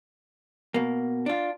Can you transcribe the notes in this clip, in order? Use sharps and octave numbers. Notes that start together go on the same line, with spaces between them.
B2 A#3
D4 F4